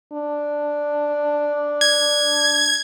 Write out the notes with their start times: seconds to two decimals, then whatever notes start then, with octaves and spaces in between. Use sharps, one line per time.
0.13 D4
1.81 G#6